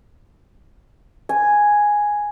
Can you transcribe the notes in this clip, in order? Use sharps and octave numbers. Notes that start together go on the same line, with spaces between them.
G#5